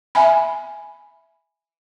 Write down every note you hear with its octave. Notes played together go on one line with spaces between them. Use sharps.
E5 G#5 B5